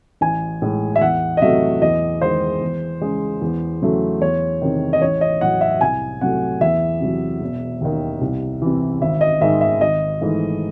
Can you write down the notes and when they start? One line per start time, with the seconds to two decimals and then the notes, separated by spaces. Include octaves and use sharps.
0.21 A1 G#5
0.62 A2 G#3
0.96 E5
1.01 E2 F#5
1.37 D#5
1.41 C3 F#3 A3 E5
1.82 E2 D#5
2.21 D#3 G#3 C5
2.61 E2
3.02 C#3 G#3
3.42 E2
3.81 C#3 F#3 A3
4.21 E2 C#5
4.62 C3 D#3
4.93 D#5
5.02 A1 C#5
5.21 D#5
5.41 A2 F#3 F#5
5.61 E5
5.81 C2 G#5
6.21 C3 F#3 A3 F#5
6.61 E2 E5
7.01 C3 F#3
7.41 E1
7.81 D#2 D#3
8.21 C2
8.62 C3 E3
9.01 G#1 E5
9.21 D#5
9.41 G#2 D#3 G#3 E5
9.61 E5
9.81 G#1 D#5
10.21 G#2 E3 A3